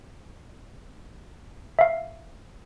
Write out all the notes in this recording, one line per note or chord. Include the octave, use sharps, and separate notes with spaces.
E5 F5